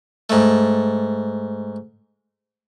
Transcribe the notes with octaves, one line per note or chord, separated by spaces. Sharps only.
G#2 A3